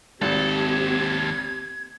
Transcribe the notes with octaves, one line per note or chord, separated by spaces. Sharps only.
G#1 D#2 C4 G4 A4 G#6